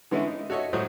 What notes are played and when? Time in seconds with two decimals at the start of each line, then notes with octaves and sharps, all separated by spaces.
0.11 D3 E3 G#3 B3 C#4 E4
0.27 D#4
0.50 F#4 A4 C#5 D#5 E5
0.73 A2 F#3 F#4 C5 D#6